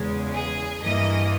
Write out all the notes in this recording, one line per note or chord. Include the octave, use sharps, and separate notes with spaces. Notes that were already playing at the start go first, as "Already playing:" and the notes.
Already playing: E2 C#3 G#3
G#4
G2 E3 A#3 D#5